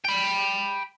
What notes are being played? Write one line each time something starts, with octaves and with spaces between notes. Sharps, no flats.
G5 B5